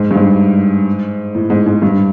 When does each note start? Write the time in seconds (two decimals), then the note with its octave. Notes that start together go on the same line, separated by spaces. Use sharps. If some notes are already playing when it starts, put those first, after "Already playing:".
Already playing: G#2
0.11 G2
0.15 G#2
1.35 A2
1.50 G#2
1.66 G#2
1.82 G2